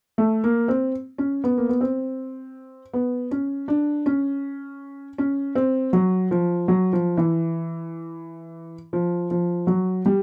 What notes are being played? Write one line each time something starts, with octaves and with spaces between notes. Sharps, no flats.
A3
A#3
C4
C#4
B3
A#3
B3
C4
B3
C#4
D4
C#4
C#4
C4
F#3
F3
F#3
F3
E3
F3
F3
F#3
G3